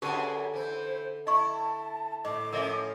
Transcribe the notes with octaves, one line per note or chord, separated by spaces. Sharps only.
F#2 D3 G4 G#4 B4 A5
E3 E4 C5
E4 D#5 A5 C#6
A2 D#5 D6
F3 C#4 A#4 D#5 E5